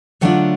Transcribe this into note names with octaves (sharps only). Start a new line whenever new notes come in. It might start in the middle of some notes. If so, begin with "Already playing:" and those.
D3 F#3 A3 D4 F4 F#5